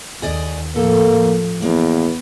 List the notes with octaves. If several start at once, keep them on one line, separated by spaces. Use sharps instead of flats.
D#2 G#4 D5 D#5
A2 F3 A#3 A4
F3
E2 A#3 B3